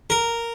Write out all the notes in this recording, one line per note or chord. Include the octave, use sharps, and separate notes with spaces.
A#4